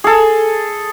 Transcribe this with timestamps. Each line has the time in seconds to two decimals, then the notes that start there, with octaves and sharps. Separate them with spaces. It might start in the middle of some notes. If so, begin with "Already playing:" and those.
0.04 G#4 A4